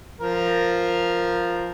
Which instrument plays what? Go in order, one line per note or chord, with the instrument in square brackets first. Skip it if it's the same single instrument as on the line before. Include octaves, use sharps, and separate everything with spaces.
[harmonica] F3 A#4